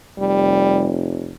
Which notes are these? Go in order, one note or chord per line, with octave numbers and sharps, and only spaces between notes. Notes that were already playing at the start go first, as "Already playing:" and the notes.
F1 G3